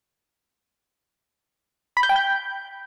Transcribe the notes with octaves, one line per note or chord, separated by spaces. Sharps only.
B5
G6
G5
G6